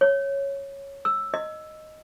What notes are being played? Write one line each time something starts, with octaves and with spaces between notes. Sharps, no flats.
C#5
E6
D#5